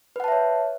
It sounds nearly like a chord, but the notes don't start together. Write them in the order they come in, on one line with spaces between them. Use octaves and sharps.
B4 F#5 A5 E5 C#5